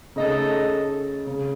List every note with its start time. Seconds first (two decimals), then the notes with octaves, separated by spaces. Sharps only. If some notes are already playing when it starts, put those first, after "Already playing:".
0.16 C#3 A3 D#4 A4 D#5
1.27 C#3